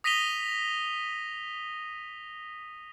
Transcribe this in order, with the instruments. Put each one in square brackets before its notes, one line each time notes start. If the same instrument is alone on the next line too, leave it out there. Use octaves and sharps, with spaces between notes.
[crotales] D#6 A#6 B6 D#7 F7 G7